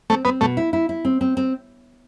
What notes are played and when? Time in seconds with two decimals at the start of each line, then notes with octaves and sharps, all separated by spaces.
0.10 A3 C4
0.25 B3 C4
0.41 B2 A3
0.57 E4
0.73 E4
0.89 E4
1.05 C4
1.21 C4
1.37 C4